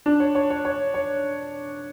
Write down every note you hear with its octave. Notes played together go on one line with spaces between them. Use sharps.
D4
C#5
C#5
C#5
C#5
C#5